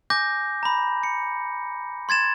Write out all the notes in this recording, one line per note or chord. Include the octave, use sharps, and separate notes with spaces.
G#5 D6 G6 A#6
A#5 B5
C#7
C6 G#6 A6 E7